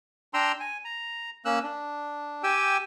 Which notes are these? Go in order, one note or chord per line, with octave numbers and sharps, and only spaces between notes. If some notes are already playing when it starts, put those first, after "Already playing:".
D4 G5 A#5 C6 E6
G#5
A#5
A#3 C#4 E6 F#6
D4
G4 G5 G#5 E6